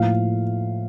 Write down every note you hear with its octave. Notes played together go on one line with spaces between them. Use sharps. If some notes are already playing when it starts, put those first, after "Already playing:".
Already playing: A2 F3 A#3 F5